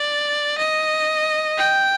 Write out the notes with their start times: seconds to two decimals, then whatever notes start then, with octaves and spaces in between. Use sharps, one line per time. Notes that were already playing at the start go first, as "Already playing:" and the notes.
Already playing: D5
0.58 D#5
1.58 G5